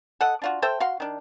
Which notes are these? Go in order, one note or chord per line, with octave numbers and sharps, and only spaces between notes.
A4 D#5 F#5
D4 F4 F#4
A4 C5 E5 G5
F#4 F5 C6
D#3 D4